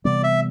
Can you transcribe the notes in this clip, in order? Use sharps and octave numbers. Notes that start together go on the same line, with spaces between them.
C3 E3 G3 B3 D5
E5